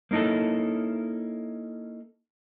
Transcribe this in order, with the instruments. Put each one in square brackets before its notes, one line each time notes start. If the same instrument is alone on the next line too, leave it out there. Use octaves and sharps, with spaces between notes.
[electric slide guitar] A#3 C#4 D#4 E4 A4